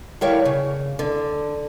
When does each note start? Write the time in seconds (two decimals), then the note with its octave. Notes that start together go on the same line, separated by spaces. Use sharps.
0.21 D3 G3 E4 A#4 C#5 F5
0.45 C#3
0.99 D3